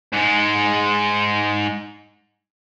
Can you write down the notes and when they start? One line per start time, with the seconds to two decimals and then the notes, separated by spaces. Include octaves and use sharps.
0.13 G#2 G#3